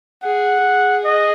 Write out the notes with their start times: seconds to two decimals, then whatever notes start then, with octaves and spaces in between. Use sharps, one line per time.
0.23 G#4 F#5
0.63 G#4
1.04 D#5